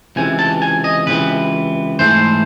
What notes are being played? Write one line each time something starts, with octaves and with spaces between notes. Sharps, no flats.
C#2 C3 E3 G#5
A5
G#5
D#5
C#2 C3 E3 B4
G#2 E3 A3 C5